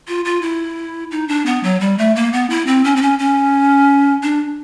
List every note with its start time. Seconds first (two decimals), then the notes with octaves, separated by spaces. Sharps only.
0.08 F4
0.25 F4
0.42 E4
1.11 D#4
1.28 D4
1.46 B3
1.63 F#3
1.80 G3
1.98 A3
2.15 A#3
2.33 B3
2.50 E4
2.67 C4
2.84 C#4
2.96 C4
3.02 C#4
3.19 C#4
4.23 D4